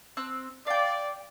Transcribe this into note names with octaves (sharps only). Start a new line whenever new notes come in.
C4 E6 F#6
D5 F5 G5